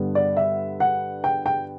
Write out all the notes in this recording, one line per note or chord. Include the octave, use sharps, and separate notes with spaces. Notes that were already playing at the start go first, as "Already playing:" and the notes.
Already playing: G2 D3 G3 B3
D5
E5
F#5
G5
G5